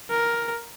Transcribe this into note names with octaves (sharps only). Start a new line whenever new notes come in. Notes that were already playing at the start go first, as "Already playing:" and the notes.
A#4